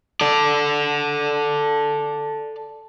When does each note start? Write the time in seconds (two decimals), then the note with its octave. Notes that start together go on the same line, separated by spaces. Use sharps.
0.21 A4 D5